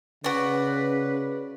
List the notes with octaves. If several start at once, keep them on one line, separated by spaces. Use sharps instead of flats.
C#3 F#4 B4 D5